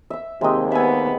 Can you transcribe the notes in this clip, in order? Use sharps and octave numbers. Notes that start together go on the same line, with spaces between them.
E5 E6
D#2 C3 G#3 C4 G4 D#5
B3 E5 G#5